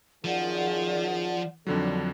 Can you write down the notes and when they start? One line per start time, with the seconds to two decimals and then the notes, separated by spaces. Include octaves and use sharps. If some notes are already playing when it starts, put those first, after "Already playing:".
0.24 F#2 D#3 F3 G#4 D5 F#5
1.67 F2 D3 D#3 F#3 G3 D4 A4